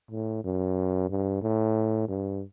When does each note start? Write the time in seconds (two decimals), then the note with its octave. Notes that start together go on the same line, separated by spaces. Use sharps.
0.11 A2
0.44 F#2
1.10 G2
1.42 A2
2.08 G2